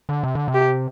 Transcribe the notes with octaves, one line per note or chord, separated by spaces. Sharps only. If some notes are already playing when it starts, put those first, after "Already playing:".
D3
C3
D3
C3
G4